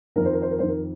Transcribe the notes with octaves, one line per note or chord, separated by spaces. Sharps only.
F2 D#3 A#4
C5
A#4
C5
A#4
F2 D#3 C5
A#4